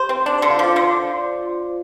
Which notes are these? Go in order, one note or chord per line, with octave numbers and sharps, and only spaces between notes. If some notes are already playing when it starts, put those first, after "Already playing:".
Already playing: G4 C5
C4
D4 D5
D3 C5
F4
F3 D5
D3 C5